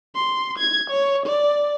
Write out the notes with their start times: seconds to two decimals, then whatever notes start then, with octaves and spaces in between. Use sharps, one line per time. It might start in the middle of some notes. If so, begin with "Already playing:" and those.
0.15 C6
0.58 G#6
0.90 C#5
1.26 D5